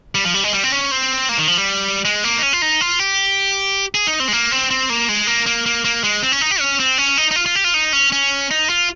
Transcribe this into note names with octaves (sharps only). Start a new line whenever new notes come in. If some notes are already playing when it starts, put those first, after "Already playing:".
G3
F3
G3
G#3
G3
C4
C#4
C4
A#3
D#3
F3
G3
G#3
A#3
D#4
C#4
F4
D#4
F4
G4
G#4
D#4
C4
G#3
A#3
C4
C4
A#3
G#3
A#3
A#3
A#3
A#3
G#3
C4
C#4
D#4
G4
C#4
C4
C#4
D#4
D#4
F4
F4
G4
F4
D#4
C#4
C#4
D#4
F4